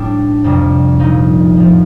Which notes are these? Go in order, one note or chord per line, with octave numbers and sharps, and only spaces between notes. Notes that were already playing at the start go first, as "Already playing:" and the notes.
Already playing: A2 G3 D4
F2 C3 G3
A#2 F3 D#4
A2 F3